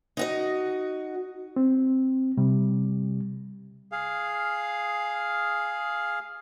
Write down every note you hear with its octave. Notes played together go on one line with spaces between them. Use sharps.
D#4 F#4 D#5
C4
C3 G3
G#4 F5